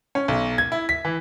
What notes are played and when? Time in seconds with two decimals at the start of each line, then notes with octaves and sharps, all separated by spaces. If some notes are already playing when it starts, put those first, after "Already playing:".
0.15 C#4
0.28 B1
0.58 G#6
0.72 E4
0.89 B6
1.05 E3